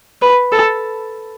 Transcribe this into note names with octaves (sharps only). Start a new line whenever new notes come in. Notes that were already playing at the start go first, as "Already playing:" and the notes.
B4
A4